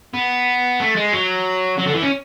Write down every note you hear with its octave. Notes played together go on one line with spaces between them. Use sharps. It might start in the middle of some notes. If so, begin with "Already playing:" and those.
B3
A3
G#3
F#3
F#3
D3
E3
C#4